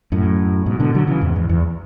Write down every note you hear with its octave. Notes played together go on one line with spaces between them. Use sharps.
F#2 A2
G#2 B2
B2 D3
D3 F#3
C#3 E3
E2 G#2
E2
E2